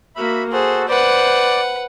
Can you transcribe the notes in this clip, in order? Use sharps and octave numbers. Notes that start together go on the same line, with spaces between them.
A#3 F#4 E5 B5
F#4 G#4 A4 C5
B4 C5 D5 F#5